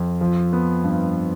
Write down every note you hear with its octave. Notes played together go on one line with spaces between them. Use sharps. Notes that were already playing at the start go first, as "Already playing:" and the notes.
Already playing: F2
F3
B3
G2